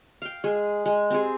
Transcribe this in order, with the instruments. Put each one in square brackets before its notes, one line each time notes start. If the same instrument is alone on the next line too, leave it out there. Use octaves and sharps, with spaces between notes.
[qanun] F5 G5
G#3 G#4
G#3
C4 G4 G#4